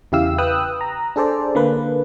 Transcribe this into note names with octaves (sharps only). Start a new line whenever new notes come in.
E2 C#3 E4 G4 F5 E6
B4 G5 D#6 E6 F#6
A#5
D4 G#4 A4 C5 D5
D3 A#3 B4